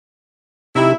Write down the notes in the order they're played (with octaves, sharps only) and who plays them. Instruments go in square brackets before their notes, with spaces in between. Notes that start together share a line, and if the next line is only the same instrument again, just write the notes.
[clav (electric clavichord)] C3 D#4 G4 [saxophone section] E4 E5